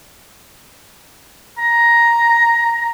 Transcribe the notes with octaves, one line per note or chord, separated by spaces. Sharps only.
A#5